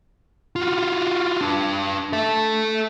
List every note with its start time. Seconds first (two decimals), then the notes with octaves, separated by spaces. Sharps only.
0.56 F4 F#4
1.41 D4 B4
2.13 A4 E5